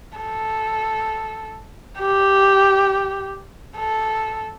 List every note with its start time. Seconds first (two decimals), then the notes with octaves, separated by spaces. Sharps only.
0.18 A4
1.98 G4
3.78 A4